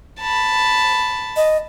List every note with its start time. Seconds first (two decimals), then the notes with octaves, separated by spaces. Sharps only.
0.21 A5 B5
1.36 D#5